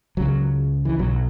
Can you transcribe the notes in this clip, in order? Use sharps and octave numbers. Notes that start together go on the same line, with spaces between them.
C#2 C#3 F#3
E3
B1 B2 F#3